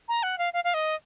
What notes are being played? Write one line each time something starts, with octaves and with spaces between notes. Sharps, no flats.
A#5
F#5
F5
F5
F5
D#5